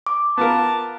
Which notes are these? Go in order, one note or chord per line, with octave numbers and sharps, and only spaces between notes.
D6
B3 F4 A#4 A5